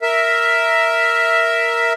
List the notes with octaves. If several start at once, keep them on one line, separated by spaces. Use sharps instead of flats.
A#4 E5